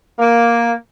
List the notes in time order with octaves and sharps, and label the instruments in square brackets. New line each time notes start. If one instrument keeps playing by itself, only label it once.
[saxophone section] A#3